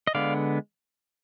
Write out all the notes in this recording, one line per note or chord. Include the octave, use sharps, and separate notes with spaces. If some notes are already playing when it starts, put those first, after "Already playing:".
D#5
D3 G#3 B3 D5 F5